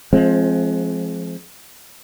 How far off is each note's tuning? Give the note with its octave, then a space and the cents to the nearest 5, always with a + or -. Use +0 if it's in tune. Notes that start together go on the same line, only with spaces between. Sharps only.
F3 -10 G#3 +30 C4 +25